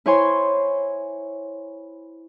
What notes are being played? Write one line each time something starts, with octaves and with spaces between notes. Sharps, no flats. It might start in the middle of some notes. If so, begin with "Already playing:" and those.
E4 C5 C#5 G#5 C6